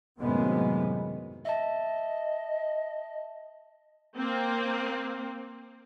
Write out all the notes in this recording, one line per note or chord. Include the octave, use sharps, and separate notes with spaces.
F#2 A2 C3 D#3 G#3 B3
D#5 E5 A5
A#3 C4